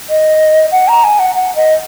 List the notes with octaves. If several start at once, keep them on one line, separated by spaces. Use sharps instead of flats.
D#5
F#5
A#5
G#5
F#5
F#5
D#5